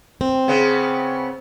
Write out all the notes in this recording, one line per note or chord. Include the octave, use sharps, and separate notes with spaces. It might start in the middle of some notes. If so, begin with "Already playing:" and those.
C4
C#3 B3